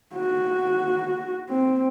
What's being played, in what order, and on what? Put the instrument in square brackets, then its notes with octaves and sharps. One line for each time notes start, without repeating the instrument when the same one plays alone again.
[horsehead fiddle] F#4
C4